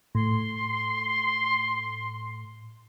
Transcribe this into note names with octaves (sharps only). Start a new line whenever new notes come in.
A2 C6